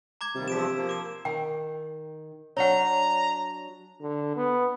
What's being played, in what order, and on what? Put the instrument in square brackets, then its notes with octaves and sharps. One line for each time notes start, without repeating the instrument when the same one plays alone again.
[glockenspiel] A#5 D6 G#6
[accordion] D#2 G3 [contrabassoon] C3
[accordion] E2 G2 F3 [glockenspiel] B6 D7 E7
[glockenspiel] E6
[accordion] F3 A#3
[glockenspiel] D6 E7
[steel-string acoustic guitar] D#3 [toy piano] G5
[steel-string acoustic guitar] F#3 D4 [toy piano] C#5 F#5 [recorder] A#5
[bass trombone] D3
B3